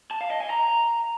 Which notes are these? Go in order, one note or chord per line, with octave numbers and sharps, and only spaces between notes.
A5
F5
D#5
G#5
A#5